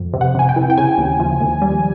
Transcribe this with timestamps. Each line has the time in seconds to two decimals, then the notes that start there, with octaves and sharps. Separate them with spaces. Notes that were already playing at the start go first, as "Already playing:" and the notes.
Already playing: F2
0.14 C3
0.21 F#5
0.35 C3 G#5
0.49 G5
0.56 E3
0.70 G5
0.78 C#3 G#5
0.98 D#2
1.20 F3
1.41 D#2
1.62 G3